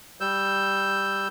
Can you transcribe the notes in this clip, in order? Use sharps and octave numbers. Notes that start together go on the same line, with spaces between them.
G3 E6 G6